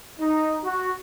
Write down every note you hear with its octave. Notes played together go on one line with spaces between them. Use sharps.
D#4
F#4